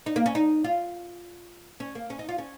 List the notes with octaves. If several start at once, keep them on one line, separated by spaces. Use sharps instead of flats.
D#4
A#3
C#4
D#4
F4
C#4
A#3
C#4
D#4
F4
C#4